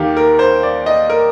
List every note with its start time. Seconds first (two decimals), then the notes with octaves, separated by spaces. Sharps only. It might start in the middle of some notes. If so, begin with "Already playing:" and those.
Already playing: D#2 D#3 A#3 G4 F5
0.17 A#4
0.39 C5
0.63 D5
0.86 D#5
1.10 A#4